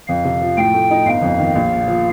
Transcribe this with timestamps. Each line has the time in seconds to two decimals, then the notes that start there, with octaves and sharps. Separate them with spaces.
0.08 F2 F5
0.25 C3
0.41 F3
0.57 A2 G5
0.74 A3
0.91 D#4
1.06 G1 F5
1.22 F2
1.39 D#3
1.55 A#1
1.72 A#2
1.88 F3